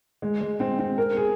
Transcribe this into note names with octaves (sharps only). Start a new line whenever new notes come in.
G#3
G#3
C4
C4
A#4
G#4